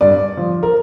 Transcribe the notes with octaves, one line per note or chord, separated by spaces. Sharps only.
G2 D5
F3
A#4